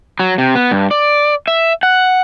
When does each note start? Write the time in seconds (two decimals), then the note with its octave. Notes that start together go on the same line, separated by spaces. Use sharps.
0.20 F#3
0.38 C3
0.55 B3
0.71 G2
0.91 D5
1.48 E5
1.83 F#5